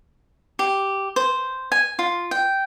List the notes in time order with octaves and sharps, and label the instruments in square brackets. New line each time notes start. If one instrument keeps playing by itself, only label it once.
[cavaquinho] G4
C5
G#5
F4
G5